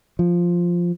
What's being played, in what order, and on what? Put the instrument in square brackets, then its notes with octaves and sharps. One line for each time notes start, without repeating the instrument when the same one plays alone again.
[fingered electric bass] F3